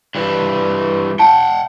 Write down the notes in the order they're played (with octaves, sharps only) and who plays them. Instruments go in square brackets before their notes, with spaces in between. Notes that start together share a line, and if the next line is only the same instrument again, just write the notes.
[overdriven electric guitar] G2 E3
[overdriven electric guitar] F#5 G5 [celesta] A5